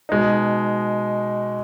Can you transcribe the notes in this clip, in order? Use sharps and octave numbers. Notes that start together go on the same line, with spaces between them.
B2 G#3 D#4